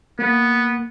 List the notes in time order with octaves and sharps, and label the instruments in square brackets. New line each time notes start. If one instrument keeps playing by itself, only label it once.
[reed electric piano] A#3 [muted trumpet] B3